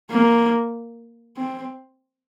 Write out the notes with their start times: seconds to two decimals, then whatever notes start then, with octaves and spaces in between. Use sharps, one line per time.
0.11 A#3
1.37 C4